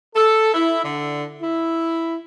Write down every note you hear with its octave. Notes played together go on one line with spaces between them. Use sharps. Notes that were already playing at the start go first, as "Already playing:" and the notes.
A4
E4
D3
E4